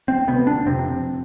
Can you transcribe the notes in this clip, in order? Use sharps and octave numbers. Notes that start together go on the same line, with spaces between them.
C4
D2 C3 B3
D4
F2 C3 C4